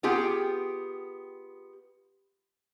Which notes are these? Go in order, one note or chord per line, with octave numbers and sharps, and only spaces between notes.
B3 F4 G4 G#4 G5